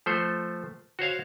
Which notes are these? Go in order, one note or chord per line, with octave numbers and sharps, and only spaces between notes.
F3 A3 A4 C5
F#4 C5 C#5 F5